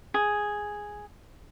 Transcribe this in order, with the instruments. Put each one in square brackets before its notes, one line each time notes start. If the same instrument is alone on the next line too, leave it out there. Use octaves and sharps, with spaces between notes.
[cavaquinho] G#4